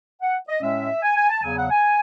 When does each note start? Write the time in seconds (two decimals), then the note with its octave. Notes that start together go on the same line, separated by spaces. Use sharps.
0.22 F#5
0.49 D#5
0.61 A2 G#3 C#4 E5
1.03 G#5
1.16 G#5
1.29 A5
1.43 E2 C#3 F#3 G#5
1.57 F#5
1.71 G#5